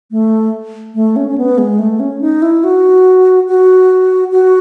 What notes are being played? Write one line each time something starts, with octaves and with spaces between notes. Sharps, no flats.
A3
A3
C#4
C#4
B3
G#3
A3
C#4
D#4
E4
F#4
F#4
F#4